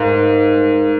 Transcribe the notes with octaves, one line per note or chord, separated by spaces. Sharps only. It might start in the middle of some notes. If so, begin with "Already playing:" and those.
Already playing: G#2 D#4 A#4 F5